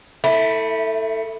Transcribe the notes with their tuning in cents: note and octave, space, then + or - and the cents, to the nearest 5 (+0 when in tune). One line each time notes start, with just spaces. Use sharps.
A3 +20 E4 -15